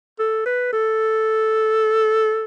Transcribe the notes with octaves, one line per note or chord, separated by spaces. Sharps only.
A4
B4
A4